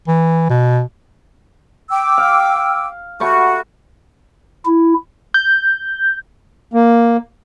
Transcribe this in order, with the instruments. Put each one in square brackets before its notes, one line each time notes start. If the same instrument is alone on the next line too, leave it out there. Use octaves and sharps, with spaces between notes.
[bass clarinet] E3
B2
[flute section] G5 D6 E6
[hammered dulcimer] F5
[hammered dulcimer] A3 B5 C#6 [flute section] F#4
[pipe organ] E4
[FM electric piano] G6
[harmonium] A#3